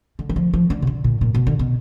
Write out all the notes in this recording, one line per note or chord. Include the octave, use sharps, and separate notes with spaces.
D3
F#3
F3
F3
D3
B2
D3
A#2
A#2
B2
D3
B2